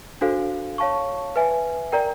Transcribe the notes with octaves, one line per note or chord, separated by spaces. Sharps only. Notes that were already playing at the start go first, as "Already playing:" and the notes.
D4 F#4 A4 C5 F5
C#5 F5 A5 C#6
B4 E5 G#5
A#4 D5 G5 A#5